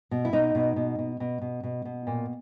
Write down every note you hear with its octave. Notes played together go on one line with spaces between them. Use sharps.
B2
E4
B2 D#4
B2
B2
B2
B2
B2
B2
B2
A#2